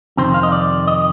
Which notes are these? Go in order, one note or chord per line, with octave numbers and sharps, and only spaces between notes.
F2 C3 D#3 C5
F5
D#5
D5
D#5